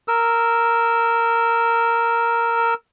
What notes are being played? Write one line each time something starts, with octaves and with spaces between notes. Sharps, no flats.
A#4 E6